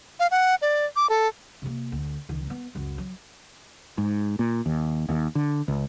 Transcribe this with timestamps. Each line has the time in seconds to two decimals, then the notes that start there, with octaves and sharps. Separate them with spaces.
0.20 F5
0.31 F#5
0.62 D5
0.96 D6
1.10 A4
1.62 C3 A#3
1.92 D2
2.29 C#2 D#3
2.46 A#3 B3
2.75 C#2 F#2
2.98 F#3
3.98 G#2
4.39 A#2
4.66 D#2
5.09 D#2
5.35 D3
5.68 C#2